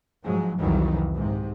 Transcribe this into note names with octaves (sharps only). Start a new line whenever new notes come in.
G#2 F3 F#3 G#3
C2 F2 D#3 E3 F#3
G#2 C3